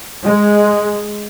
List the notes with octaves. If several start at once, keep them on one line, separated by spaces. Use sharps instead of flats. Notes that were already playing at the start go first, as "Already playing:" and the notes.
G#3